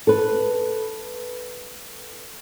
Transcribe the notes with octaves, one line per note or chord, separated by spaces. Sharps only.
A4 B4